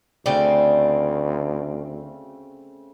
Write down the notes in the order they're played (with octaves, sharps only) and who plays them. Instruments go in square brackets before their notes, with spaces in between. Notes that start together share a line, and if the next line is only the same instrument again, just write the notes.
[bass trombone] D2 [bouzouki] C#3 A3 C4 [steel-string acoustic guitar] D5